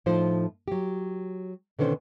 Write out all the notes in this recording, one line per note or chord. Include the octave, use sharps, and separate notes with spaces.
A2 F3 D#4 C5
F#3 G4
B2 D3 D#3 C#4 C5